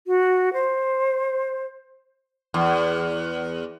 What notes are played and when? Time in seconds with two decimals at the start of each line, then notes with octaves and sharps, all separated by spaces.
0.07 F#4
0.53 C5
2.54 E2